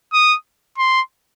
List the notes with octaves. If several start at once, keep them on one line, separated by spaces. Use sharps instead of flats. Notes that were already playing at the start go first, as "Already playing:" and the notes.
D#6
C6